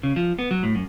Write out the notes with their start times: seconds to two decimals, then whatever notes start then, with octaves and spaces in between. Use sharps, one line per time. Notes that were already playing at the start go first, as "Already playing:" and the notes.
0.03 C#3
0.16 F3
0.39 B3
0.51 F#3
0.63 A2
0.75 F#2